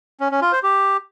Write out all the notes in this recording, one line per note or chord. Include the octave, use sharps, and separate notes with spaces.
C#4
C#4
F4
C5
G4